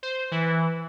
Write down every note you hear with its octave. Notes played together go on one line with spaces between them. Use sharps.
C5
E3